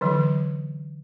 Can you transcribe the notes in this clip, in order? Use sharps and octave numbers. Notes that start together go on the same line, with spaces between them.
D3 E3 F#3